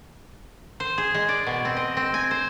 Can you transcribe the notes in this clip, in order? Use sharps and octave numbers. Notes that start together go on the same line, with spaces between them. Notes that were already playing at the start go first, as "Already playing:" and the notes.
C5
G#4
G#3
D5
B2
C4
D#5
C4
G#5
C5